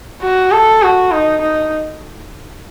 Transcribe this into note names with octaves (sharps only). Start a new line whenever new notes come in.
F#4
A4
F#4
D#4
D#4